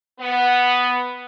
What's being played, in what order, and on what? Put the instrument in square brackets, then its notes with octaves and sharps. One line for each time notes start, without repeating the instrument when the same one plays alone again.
[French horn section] B3